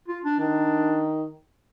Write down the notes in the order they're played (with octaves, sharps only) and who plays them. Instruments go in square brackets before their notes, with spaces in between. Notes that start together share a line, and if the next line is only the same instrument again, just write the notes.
[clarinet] F4
D4
[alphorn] D#3 [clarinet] D4